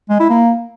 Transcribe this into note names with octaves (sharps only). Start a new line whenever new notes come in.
G#3
E4
A#3